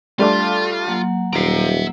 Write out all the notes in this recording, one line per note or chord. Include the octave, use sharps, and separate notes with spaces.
G3 A3 D4 F4
F#3 A#3 F#5
D#1 E5 A#5 C7 D7